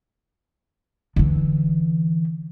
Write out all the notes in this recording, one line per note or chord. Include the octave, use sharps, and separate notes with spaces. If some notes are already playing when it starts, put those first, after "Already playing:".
D3 E3